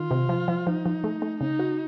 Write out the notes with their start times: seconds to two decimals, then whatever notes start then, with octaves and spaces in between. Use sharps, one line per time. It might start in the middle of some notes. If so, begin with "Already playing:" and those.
Already playing: D#3 F4
0.11 C3
0.29 F3
0.48 F3
0.67 F3 D#4
0.86 F3
1.04 A3
1.22 A3
1.41 C#3 D#4
1.59 F#4